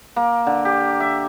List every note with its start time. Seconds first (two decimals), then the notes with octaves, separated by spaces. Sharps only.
0.16 A#3
0.47 D3
0.65 G4
1.00 E5